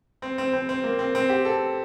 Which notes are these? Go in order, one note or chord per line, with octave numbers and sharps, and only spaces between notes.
C4
C4
C4
C4
A#3
C4
C4
G4
A4